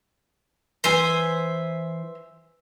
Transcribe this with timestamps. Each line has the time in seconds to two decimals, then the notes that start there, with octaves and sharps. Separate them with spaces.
0.84 E3 B4 C5 E5 G#5